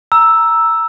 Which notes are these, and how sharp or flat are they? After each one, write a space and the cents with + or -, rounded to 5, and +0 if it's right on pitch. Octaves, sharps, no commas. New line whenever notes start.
A#5 +5 E6 +0